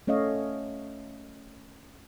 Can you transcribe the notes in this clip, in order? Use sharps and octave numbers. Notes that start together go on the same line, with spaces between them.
A3 C#4 C#5 D#5 F5